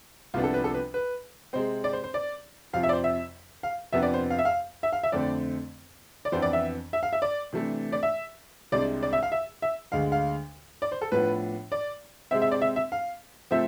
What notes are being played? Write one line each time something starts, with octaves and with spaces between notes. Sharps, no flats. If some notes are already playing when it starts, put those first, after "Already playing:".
C2 C3 F3 B3 D4 F4
A4
B4
A4
B4
B4
C3 G#3 C4 C5
D5
C5
C5
D5
F2 C3 F3 F5
E5
D5
C5
E5
F5
F2 C3 F3 B3 D4 E5
D5
C5
F5
E5
F5
E5
F5
E5
F2 D3 A3 C4 D5
D5
F2 E3 B3 D4 C5
D5
E5
E5
F5
E5
D5
C3 E3 A3 D4
D5
E5
C2 C3 G#3 D4 D5
D5
E5
F5
E5
E5
D2 D3 G#3 F5
F5
D5
C5
A4
A2 F3 B3 D4 B4
D5
C3 G#3 C4 E5
E5
D5
E5
E5
F5
C3 F3 A3 C4 E5